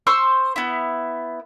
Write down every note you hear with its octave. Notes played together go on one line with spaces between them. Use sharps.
C5 C6 C#6 E6
B3 E4